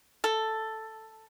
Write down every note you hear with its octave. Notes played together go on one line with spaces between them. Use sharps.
A4